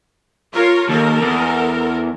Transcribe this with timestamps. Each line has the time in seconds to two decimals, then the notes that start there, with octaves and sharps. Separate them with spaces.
0.54 F4 A#4 C#5
0.89 D#2 A4 A#4
1.21 E2